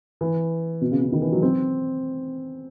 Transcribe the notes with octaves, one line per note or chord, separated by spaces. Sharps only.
E3
B2
C#3
C#3
D#3
E3
F#3
C4